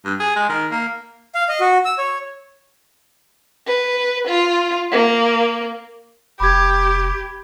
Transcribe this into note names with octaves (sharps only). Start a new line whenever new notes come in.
G2
G#4
G#3
D#3
A#3
F5
D#5
F#4
E6
C#5
B4
F4
A#3
F1 G4 B5 D6 G#6